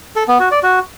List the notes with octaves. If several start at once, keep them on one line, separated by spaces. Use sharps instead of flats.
A4
B3
F#4
D5
F#4